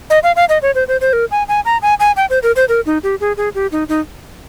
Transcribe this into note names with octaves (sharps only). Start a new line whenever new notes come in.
D#5
F5
F5
D#5
C#5
C5
C5
C5
A#4
G#5
G#5
A#5
G#5
G#5
G5
C5
A#4
C5
A#4
D#4
G4
G#4
G#4
G4
D#4
D#4